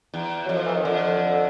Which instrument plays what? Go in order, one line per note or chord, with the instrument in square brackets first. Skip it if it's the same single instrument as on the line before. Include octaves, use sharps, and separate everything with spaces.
[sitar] E2
[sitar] F2 [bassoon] F#3
[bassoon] F3
E3
D#3
[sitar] F2 [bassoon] D3